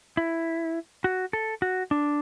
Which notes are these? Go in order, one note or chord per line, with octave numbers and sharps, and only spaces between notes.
E4
F#4
A4
F#4
D4